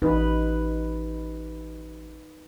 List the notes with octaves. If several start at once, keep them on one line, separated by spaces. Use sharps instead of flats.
A1 D#4 B4